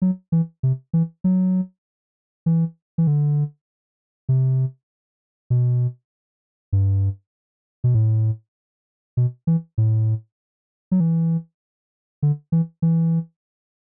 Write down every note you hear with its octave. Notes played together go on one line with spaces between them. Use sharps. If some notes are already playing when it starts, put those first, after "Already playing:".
F#3
E3
C3
E3
F#3
E3
E3
D3
C3
B2
G2
B2
A2
B2
E3
A2
F#3
E3
D3
E3
E3